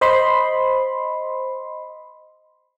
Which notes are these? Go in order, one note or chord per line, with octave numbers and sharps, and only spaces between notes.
C5 D#5 B5 C6